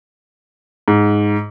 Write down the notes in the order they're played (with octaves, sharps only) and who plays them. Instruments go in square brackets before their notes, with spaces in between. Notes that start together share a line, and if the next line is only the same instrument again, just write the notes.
[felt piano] G#2